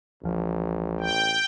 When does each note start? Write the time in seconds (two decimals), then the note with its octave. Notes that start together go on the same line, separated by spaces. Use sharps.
0.24 D1 A1 F3
1.00 G5